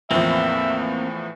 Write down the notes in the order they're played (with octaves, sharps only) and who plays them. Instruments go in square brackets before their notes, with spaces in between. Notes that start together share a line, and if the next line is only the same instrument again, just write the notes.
[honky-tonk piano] E2 A2 F3 [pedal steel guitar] A#3 C4 [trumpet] E5